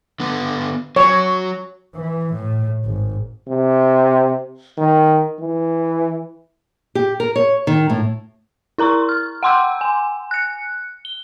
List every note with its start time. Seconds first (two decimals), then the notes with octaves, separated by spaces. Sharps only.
0.20 D3 B3 B4
0.96 F#3 F#4 C#5
1.95 E3
2.34 A2
2.85 G#1
3.48 C3
4.78 D#3
5.40 E3
6.95 G4
7.20 A#4
7.36 C#5
7.67 D#3
7.89 A2
8.78 E4 A#4 A#5 C6 C#6
9.09 F6
9.43 F#5 G5 C6 D6 E6 G6
9.81 G#5
10.31 F#6 C#7
11.05 G7